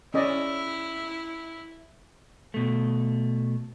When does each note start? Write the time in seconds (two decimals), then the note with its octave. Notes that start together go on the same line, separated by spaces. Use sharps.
0.14 C#4 E4 D5 D#5
2.54 B2 A3